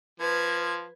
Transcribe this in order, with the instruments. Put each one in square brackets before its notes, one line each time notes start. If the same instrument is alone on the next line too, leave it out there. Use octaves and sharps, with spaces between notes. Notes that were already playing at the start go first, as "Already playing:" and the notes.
[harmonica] F3 [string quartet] B4 G#6